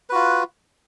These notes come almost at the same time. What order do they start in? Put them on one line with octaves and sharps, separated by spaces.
B4 F#4 F4